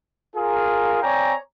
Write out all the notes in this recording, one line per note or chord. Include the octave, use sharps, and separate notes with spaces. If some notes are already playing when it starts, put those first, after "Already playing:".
F4 G#4 A#4
C4 C#5 D5 G5 G#5 A#5